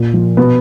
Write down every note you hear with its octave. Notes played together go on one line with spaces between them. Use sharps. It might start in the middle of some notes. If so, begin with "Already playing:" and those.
Already playing: A#2 A#3
F3
B2 B3